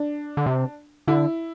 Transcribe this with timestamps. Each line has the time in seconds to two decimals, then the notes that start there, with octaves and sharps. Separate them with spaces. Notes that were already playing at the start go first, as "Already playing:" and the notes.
Already playing: D4
0.37 D3
0.46 C3
1.07 D3 E4